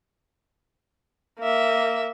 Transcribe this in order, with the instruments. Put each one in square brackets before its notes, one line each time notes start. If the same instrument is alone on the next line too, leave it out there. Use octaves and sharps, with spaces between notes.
[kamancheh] A#3 E5